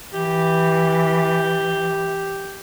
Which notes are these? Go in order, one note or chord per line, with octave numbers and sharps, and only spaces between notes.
E3 G4